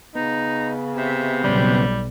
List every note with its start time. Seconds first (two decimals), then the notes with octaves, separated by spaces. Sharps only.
0.15 C#3 B3 D#4
0.96 C3 E5
1.44 B1 C#3 G3 B3